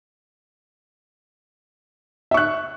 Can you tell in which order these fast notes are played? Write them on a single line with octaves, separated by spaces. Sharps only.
E5 C#6 F#6